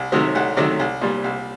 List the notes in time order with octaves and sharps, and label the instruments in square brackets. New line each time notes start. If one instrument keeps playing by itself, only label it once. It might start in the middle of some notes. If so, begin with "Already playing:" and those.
Already playing: [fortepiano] C2
C3 D#3 F#3 A3
C2 F#5
C3 D#3 F#3 A3 D5
C2
A#2 G3
C2